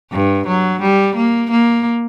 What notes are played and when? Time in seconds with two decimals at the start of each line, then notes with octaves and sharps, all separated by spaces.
0.11 G2
0.47 F#3
0.81 G3
1.15 A#3
1.51 A#3